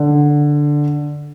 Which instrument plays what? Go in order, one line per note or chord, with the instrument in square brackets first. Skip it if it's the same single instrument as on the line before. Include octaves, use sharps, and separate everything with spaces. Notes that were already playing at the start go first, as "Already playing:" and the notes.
Already playing: [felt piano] D3